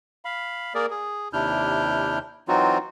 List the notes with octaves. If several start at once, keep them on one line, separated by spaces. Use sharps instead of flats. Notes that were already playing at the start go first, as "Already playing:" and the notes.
F5 B5
A#3 G#4 A#4 D5
G#4
D#2 C3 D4 E4 F6 G6
E3 F#3 C4 D#4 F4 F#4